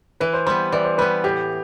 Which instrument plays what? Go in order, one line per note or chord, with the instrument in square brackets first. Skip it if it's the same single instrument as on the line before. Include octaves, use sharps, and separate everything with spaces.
[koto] E3 [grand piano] B4
[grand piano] C5
[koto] G3 B3 [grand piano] C5
[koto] E3 [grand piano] D5
[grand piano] C5
[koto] G3 B3 [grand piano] B4
[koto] A2 [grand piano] G4